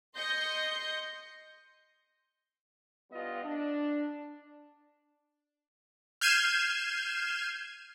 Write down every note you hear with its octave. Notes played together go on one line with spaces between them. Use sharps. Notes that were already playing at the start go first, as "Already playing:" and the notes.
D#5 C6 G6 A#6 C#7
G2 G3 B3 F4 D#5
D4
F6 G6 G#6 C7 D#7 E7